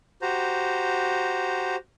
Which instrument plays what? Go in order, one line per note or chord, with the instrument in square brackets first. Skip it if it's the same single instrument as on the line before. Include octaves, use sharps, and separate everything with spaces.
[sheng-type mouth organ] F#4 G4 C5 A#5